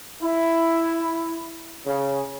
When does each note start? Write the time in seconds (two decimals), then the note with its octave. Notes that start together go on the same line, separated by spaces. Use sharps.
0.22 E4
1.86 C#3